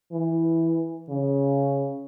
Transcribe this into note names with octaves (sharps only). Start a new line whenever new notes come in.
E3
C#3